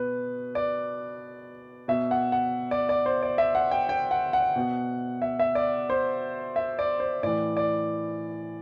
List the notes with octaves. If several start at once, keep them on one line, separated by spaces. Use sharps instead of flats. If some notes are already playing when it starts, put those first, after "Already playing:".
Already playing: B2 B4
D5
B2 E5
F#5
F#5
D5
D5
C5
D5
E5
F#5
G5
G5
F#5
F#5
B2
E5
E5
D5
C5
E5
D5
C5
A2 E3 D5
D5